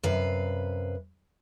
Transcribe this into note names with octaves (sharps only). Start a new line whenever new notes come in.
F#2 C3 B4 F5